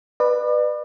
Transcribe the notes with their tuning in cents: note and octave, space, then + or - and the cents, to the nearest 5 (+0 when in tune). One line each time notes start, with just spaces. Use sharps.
B4 +0 D5 +40